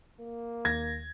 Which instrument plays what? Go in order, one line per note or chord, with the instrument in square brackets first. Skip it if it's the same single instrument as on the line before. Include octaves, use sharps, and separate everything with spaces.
[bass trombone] A#3
[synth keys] D#2 A#6 [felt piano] G#6